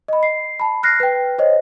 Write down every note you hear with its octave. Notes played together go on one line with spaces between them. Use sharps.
D#5 B5
C7
A5 B5
F6 F#6 A#6 C7
B4 G5
C5 C#5 D#5